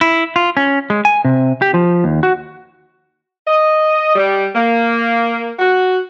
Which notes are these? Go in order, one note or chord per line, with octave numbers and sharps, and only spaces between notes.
E4
F4
C#4
G#3
G#5
C3
G4
F3
D#2
F#4
D#5
G3
A#3
F#4